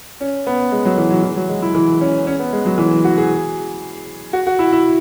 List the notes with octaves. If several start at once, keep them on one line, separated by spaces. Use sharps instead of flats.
C#4
B3
G#3
F#3
E3
F#3
E3
F#3
G#3
E4
E3
C#4
C#4
B3
G#3
F#3
E3
F#4
G#4
F#4
F#4
E4
E4